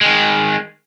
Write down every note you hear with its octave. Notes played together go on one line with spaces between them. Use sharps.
D#3 G#3